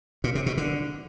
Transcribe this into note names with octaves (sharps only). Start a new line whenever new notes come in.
A#2
C3
B2
D3